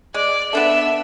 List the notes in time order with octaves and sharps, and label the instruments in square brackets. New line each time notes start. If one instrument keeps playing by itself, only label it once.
[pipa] G#3 [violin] D5
[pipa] B3 D4 A4 [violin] E5